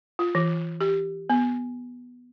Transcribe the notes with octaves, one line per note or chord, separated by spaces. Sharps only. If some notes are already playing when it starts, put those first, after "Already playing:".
F4
E3
G4
B3